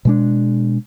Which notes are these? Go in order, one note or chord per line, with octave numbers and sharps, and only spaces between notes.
B2 G#3 D4